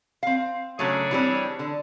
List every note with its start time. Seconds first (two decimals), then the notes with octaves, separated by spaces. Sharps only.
0.23 C4 F5
0.79 C#3 F#3 A3 D4 G#4 C#5
1.11 E3 G3 C4
1.59 D3